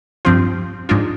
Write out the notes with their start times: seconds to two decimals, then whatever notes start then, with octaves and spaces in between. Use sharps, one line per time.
0.25 G2 F3 C4 F4 C5
0.89 G#2 F3 G#3 D4 F4